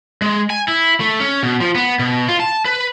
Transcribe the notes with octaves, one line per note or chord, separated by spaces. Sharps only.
G#3
G#5
E4
A3
C#4
B2
F3
B3
B2
F4
A5
B4